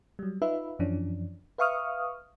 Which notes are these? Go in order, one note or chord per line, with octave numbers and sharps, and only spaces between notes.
F#3 G3
D#4 F4 B4 E5
F#2 E3 F3 C#4 D4
B4 E5 F5 C#6 D#6 F6